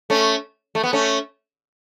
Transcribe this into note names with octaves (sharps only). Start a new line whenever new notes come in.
A3 C#4
A3
B3
A3 C#4